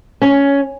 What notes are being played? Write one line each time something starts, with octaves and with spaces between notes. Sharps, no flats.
C#4